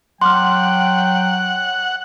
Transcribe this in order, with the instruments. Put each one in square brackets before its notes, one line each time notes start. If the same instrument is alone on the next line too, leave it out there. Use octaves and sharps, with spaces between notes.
[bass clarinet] F#3 [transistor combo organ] F#5 [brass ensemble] G5 [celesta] C6 D6 F6